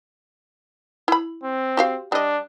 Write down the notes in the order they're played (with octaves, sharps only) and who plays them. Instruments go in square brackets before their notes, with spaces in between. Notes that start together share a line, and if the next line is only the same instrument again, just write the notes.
[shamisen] E4 B5
[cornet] C4
[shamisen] F#4 G4 F5
[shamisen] G3 D#5 [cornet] D4